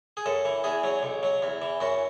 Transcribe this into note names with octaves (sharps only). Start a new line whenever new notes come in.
G#4
F#2 A4
E3
E2 G#4
F#3
B1
F#3
E2
E3
F#2 F#4